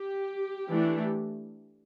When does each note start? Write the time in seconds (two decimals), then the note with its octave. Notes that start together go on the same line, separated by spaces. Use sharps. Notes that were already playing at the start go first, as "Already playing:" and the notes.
Already playing: G4
0.69 E3 A3 D4